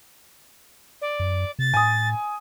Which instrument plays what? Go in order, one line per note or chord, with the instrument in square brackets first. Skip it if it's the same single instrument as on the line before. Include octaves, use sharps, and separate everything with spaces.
[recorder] D5
[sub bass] F#2
[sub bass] C3 [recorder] A6
[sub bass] A2 [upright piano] G#5 D#6